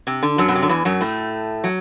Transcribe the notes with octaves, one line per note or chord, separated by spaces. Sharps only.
C3
D3
F#2 F#3
B2
C3
D3
E2 E3
F#2 F#3
A2 A3
F#3